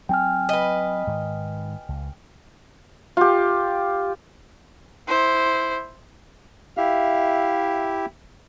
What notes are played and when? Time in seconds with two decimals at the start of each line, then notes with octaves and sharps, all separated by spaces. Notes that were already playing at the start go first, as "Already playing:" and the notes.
0.09 F#3 C4 G5 G#5 F6
0.49 B4 D#5
1.07 G#2 D#3
1.89 C#2
3.17 F4 G4
5.07 E4 C5
6.77 E4 G4 E5 F5